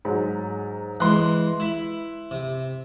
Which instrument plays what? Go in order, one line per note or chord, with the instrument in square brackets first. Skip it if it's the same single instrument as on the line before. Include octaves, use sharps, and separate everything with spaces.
[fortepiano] G#2 F#3
[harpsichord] E3 G#3 [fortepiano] C6 F#6
[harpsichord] E4 B5
C3